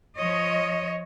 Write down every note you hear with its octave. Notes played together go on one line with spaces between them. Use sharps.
F3 C#5 D#5